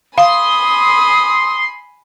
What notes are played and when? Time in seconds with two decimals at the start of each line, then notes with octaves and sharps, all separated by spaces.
0.18 F5 G#5 B5 C6 D#6